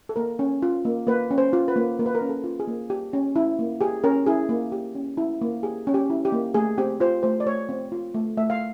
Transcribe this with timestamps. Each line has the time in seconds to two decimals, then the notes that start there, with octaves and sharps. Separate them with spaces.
0.09 A4
0.16 A#3 A#4
0.39 C#4
0.62 F4
0.85 A#3
1.07 A#3 B4
1.31 C#4
1.38 C5
1.53 F4
1.68 B4
1.76 A#3
1.99 A#3 A#4
2.06 B4
2.15 A#4
2.21 C#4
2.29 A4
2.44 F4
2.60 G#4
2.68 A#3
2.90 G4
3.13 C#4
3.36 E4
3.59 A#3
3.81 G4 G#4
4.04 C#4 A#4
4.26 E4 G#4
4.49 A#3
4.72 G4
4.95 C#4
5.17 E4
5.41 A#3
5.63 G4 G#4
5.87 C#4
5.94 G4
6.10 E4
6.25 G4
6.32 A#3
6.54 A3 G#4
6.78 C4 G4
7.00 F4 C5
7.23 A3 C5
7.40 D5
7.46 A3 C#5
7.69 C4
7.92 F4
8.15 A3
8.37 A3 E5
8.50 F5